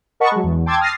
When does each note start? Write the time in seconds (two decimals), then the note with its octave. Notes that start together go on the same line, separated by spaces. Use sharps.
0.20 A#4 D#5 F#5 A5 B5 C#6
0.31 F#3 G#3
0.44 E2
0.66 G5 A5 C6 D6 E6 G#6
0.80 D#6 F6 A6 A#6 C7